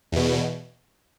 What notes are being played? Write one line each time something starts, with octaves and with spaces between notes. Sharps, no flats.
E2 B2